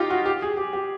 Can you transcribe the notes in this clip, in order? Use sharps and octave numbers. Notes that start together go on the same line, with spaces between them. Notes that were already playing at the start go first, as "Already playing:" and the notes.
Already playing: D#4 F4 G4
F#4
G4
G#4
G4
G4